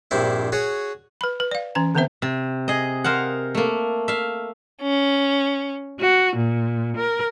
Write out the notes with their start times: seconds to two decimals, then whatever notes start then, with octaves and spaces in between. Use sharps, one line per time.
0.11 A#1 G2 C4 E4
0.52 F#4 G#4 C#5
1.21 B4 B5
1.40 B4
1.51 D5 F5
1.75 E3 C#4 A#5
1.95 D3 D#3 B3 C4 C5 E5
2.22 C3
2.68 G#4 D#5
3.04 A#4 C5 F5 F#5
3.55 A3 A#3
4.08 E5 F5
4.82 C#4
5.99 F#4
6.36 A#2
6.97 A#4